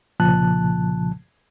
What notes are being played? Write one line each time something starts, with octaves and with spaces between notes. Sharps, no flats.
C2 A#2 C#3 F3 A5 F#6